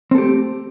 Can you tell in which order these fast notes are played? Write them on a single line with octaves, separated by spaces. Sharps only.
C4 A4 G4 A3